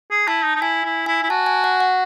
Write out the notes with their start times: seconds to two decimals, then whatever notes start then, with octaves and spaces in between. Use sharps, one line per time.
0.11 G#4
0.28 E4 A5
0.45 D#4
0.55 D#4
0.61 E4 G#5
0.84 E4
1.06 E4 G#5
1.23 E4
1.30 F#4 A5
1.46 G#5
1.64 F#5
1.80 F#5